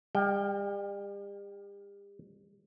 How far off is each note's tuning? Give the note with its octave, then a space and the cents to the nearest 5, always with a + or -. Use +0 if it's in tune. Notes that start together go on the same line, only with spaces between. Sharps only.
G3 +40 G5 +0